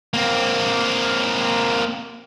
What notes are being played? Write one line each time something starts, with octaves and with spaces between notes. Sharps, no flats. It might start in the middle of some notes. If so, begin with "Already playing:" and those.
A#3 C4